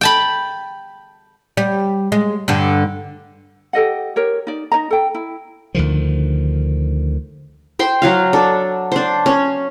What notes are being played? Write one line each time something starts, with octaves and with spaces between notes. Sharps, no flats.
G5 A5 B5
G3
G#3
G2 D3
G4 A4 D#5 F#5
G4 A#4 C#5
D#4 D5
D#4 C#5 D#5 A#5
A4 G5
E4
D2 D3 D#3 F3
C5 G5 C6
F#3 F#4 F5
D4 A4
D4 C5
C#4